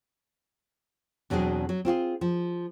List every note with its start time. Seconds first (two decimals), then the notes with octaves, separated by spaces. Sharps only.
1.30 E2 B2 F#3 C4 D4 G#4
1.69 F#3
1.85 C4 F4 F#4 G#4
2.21 F3